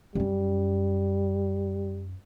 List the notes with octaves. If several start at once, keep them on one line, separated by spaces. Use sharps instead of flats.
F#2 G3 C#4